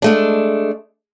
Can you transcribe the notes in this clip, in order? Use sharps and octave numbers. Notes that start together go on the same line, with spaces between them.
G#3 A3 D4